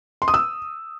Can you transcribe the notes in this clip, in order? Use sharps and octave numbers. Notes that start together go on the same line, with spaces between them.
C6
D#6
E6